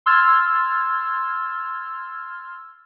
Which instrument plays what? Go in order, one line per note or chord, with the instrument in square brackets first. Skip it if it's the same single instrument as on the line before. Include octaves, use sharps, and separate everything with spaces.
[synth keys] C6 E6 F6 G#6 A6